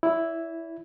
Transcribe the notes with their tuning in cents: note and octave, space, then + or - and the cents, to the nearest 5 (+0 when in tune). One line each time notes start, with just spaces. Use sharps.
E4 +0 D5 -45